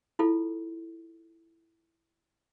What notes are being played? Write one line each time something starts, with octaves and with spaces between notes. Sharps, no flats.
E4 F4 A4